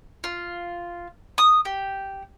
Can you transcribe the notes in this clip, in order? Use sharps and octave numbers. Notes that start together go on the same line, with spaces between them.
F4
D#6
G4